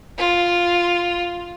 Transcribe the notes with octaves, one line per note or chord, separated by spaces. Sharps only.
F4